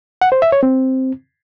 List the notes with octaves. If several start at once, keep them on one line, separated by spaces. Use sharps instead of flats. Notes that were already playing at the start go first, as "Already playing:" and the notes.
F#5
C5
E5
C#5
C4